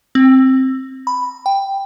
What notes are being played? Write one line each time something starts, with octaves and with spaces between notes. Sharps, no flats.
C4
B5
G5